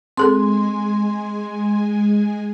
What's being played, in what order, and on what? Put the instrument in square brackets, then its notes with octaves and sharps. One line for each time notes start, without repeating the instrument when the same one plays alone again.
[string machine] G#3 G#5 [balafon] C4 G#4 A4 [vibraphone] C6